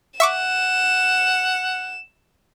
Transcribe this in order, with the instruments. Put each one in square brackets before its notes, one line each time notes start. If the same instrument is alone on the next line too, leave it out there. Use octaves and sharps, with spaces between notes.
[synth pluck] E5 C#6 D6 [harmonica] F#5 [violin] E7